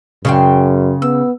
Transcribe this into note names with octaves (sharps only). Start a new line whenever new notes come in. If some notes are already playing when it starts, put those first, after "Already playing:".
F#2 C#3 G5 C6 C#6
B3 E6